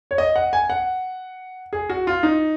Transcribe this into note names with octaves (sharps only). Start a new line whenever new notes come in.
C#5
D#5
F#5
G#5
F#5
G#4
F#4
F4
D#4